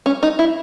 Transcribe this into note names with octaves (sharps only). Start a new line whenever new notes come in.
C#4
D#4
E4